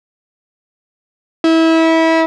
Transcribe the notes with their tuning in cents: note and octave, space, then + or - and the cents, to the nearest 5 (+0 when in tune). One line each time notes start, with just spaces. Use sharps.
E4 -25